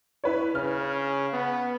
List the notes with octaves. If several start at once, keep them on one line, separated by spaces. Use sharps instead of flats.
E4 B4 C#5
C#3 F6
B3